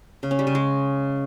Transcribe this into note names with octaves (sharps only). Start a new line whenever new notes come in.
C#3
C#4
G3
C#3
G#3